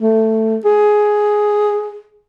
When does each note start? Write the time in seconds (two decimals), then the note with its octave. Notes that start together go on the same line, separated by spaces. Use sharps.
0.02 A3
0.65 G#4